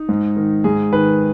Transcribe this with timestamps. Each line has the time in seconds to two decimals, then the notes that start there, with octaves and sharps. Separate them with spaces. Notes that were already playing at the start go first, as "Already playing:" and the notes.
Already playing: D#4
0.09 G#2
0.36 D#3
0.64 G#2 G#4
0.92 D#3 B4